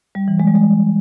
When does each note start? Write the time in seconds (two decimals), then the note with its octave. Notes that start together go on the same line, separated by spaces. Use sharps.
0.15 G3
0.28 E3
0.40 G#3
0.47 G3
0.56 G#3